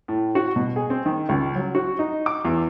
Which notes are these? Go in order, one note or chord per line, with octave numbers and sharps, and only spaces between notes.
A2
F#4
B2
G#4
C4
D#3
C#2
F#3
F#4
D#4
D6
E2